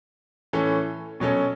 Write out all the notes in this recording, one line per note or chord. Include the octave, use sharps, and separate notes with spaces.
A2 E3 C#4 A4
B2 F#3 C#4 A4